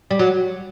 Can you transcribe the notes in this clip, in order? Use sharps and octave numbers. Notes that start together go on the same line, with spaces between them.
G3
F#3